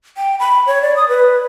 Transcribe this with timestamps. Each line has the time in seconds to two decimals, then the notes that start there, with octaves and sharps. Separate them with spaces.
0.17 G5
0.39 B5
0.67 C#5
0.82 D5
0.96 D#6
1.09 B4